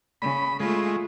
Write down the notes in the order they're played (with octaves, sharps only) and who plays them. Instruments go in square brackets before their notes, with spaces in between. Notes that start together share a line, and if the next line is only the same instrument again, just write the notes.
[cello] C#3 [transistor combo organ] B5
[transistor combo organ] G#3 [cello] A3 F4